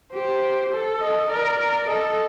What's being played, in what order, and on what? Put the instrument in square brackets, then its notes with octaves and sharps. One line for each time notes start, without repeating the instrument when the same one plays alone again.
[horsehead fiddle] G4 [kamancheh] C5
[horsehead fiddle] A4
[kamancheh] D#5
[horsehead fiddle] A#4 [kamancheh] D5
[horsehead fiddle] A#4
[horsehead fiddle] A4 [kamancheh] D#5